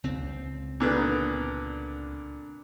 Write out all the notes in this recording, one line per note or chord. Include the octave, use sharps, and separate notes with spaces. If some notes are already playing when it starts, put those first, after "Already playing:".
C#2 C4
A#2 D3 B3